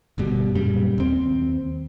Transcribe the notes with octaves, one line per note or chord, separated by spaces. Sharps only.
G1 G2 B2 G3
F#2 A#2 C#3 G3
D#2 C4